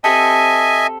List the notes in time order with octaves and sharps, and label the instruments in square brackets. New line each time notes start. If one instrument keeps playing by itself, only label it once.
[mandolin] C4 G4 A4 [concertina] D#5 E5 G#5